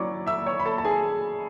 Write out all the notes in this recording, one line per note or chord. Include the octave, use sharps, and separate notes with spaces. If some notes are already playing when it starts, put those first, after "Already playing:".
Already playing: F#3 C#4 E4 D5 C#6 D6
E5 E6
C#5 C#6
B5
A4 A5
A5
G#4 G#5